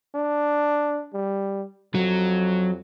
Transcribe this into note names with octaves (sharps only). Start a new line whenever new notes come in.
D4
G3
F2 F#3